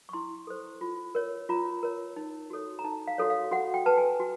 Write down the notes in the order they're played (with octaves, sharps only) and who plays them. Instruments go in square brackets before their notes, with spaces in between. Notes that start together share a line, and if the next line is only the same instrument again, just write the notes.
[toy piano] C#6
E4 C6
A4 C5
F4
A#4 C#5
F4 A#5
A#4 C#5
D#4
F#4 A4 C#5
A#5
D#4 A5
F5
F#4 A4 C#5
F5
F#4 F#5
G5
B4 A5
G#5
F#4